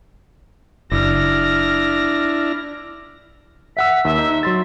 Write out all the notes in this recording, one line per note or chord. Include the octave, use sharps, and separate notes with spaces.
F#1 D4 E4 F6 A#6
E5 F#5 E6 B6
D#2 E5
D#4
F#3 C6 A6